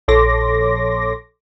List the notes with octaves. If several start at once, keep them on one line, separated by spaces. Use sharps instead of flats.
A#1 A4 C#5 C6 D6 A#6